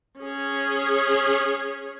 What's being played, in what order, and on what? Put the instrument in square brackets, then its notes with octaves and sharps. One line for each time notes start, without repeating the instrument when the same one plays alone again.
[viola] C#4 G#4